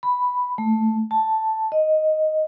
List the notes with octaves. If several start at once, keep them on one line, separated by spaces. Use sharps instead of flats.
B5
A3
A5
D#5